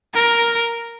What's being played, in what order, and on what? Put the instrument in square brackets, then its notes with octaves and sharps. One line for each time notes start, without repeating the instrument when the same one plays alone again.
[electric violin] A#4